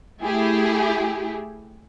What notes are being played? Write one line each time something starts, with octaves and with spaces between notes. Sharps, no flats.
A3 E4 G4 G#4